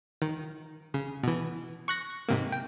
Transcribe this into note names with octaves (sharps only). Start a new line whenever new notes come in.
D#3
C#3
B2 E3
C#6 F#6 A#6
G#2 C3 A#3
G5